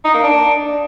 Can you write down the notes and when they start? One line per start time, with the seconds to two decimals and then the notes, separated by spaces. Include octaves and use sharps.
0.05 D#4
0.14 A#3
0.24 D4